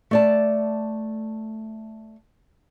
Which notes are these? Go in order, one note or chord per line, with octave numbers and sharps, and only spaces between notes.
A3 D5 A5